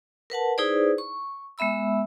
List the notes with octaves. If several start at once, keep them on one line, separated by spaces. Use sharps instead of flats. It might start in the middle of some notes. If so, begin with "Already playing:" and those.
A#4 B4 F#5 A5
D#4 E4 G#4 B4 C5 D5
C#6
G#3 B3 E5 B5 E6